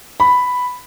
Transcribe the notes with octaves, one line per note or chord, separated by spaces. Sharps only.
B5